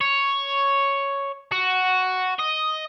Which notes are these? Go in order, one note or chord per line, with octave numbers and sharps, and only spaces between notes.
C#5
F#4
D#5